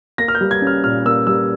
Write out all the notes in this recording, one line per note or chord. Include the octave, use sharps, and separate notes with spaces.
A#3 A#6
F6
G6
G3
G#6
C#4
F6
A#2 F6
A#3 E6
G3 E6